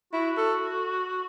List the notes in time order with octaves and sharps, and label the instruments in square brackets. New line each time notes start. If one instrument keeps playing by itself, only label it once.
[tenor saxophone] E4 [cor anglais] F#4
[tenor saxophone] A4